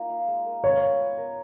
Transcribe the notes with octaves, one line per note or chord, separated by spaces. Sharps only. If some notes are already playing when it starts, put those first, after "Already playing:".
Already playing: A#3 D#4 F4 A#4
F5
G#3
A#4
F4 C#5
B3
B3
A#4